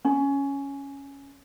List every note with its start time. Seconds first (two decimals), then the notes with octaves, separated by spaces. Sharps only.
0.05 C#4